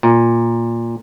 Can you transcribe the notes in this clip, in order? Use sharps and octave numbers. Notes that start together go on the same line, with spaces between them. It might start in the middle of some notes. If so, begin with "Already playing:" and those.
A#2